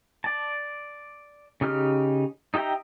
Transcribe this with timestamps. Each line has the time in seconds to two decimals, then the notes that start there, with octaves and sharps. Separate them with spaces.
0.24 D5 A5
1.61 C#3 D#4 G4 F6
2.54 D#4 G4 E5 G5 A#5